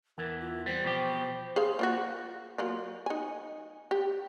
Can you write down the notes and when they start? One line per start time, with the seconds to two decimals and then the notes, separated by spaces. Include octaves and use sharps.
0.18 E2 E3 A#4
0.41 F4
0.66 G3 C4 C5
0.84 B2 F3 G4
1.56 G#4 C5 F5
1.79 A#3 F4 F#4
2.58 F#3 A#3 F4
3.06 D#4 G#5
3.91 G4